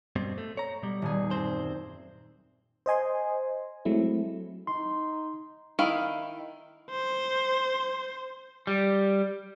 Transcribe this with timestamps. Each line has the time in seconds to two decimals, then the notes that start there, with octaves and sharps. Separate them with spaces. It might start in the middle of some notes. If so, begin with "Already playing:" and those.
0.16 G2 B2 C4
0.38 A3
0.57 C#5 A#5
0.83 B2 G3
1.02 D#1 G#4
1.31 F#2 C4 C5
2.86 C5 D#5 G#5 C6
3.85 F#3 G#3 A3 C4 E4
4.67 D#4 C6
5.79 D#3 E4 F5
6.90 C5
8.67 G3